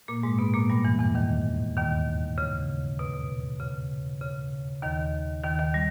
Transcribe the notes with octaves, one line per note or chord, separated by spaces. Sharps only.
A#2 A#3
G#2 G#3
B2 B3
A#2 A#3
G2 G3
E2 E3
E2 E3
D#2 D#3
D#2 D#3
C#3
B2
C#3
C#3
D#2 D#3
D#2 D#3
D#2 D#3
G3